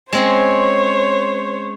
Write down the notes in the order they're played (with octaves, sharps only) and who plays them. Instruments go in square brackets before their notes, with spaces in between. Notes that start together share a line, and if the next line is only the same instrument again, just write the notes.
[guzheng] G#3 C4 C#4 [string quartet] C5 C#5